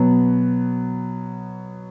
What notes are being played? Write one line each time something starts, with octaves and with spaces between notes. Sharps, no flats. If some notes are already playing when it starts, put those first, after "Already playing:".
Already playing: B2 F#3 B3